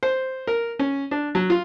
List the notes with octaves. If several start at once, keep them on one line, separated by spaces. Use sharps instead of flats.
C5
A#4
C#4
D4
F#3
F4